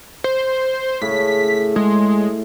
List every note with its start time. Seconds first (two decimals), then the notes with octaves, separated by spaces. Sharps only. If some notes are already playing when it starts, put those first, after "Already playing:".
0.24 C5
1.02 A2 C#3 B6
1.76 G#3 C6